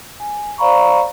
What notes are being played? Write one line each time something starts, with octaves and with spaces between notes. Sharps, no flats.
G#5
C5 D5 F5 A#5 B5 C#6